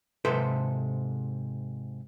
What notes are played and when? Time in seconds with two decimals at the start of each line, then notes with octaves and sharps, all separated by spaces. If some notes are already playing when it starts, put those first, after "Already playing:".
0.25 G#2 C3 A4 B4 C5